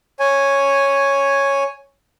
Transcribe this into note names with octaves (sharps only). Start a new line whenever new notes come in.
C#5 G#5